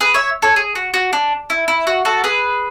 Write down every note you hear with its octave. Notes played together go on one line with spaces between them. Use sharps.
G#4 B4
C#5 E5
A4 C#5
G#4
F#4
F#4
D4
E4
E4
F#4
F#4 A4
G#4 B4